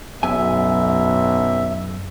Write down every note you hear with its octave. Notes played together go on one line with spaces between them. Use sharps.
B1 F#2 E5 G#5